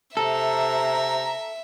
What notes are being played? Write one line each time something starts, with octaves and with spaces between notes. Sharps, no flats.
C3 A4 E5 A#5